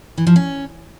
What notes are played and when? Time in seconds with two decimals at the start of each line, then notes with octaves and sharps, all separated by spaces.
0.18 E3
0.27 F3
0.36 C#4